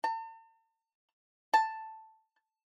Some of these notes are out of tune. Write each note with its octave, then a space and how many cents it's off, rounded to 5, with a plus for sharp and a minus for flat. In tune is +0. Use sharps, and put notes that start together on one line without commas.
A5 +45
A5 +5